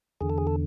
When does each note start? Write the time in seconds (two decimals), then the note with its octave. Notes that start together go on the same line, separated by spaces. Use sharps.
0.21 E2 D3 G#4
0.30 A4
0.38 G#4
0.47 A4